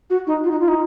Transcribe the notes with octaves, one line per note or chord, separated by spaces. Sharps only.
F#4
D#4
F4
D#4
F4
D#4